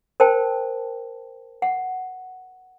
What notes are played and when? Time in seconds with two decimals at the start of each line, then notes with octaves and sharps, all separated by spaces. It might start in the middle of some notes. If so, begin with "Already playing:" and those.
0.20 A#4 C5 G5 A5
1.62 F#5